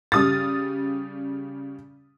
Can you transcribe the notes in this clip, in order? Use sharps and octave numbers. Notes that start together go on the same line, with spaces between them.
C#3 G3 D#6 F6 A6